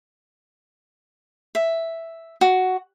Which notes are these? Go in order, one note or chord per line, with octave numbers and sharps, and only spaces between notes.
E5
F#4